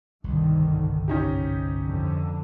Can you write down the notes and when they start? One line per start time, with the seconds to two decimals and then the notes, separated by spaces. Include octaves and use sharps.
0.24 G1 C2 G#2 D3 D#3
1.08 G#2 C#4 D#4 G4
1.85 F2 D3